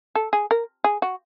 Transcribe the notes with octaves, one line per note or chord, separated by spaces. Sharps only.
A4
G#4
A#4
G#4
F#4